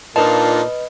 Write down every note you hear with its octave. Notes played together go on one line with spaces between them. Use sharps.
A#2 D4 D#4 F4 B4 D#5 A5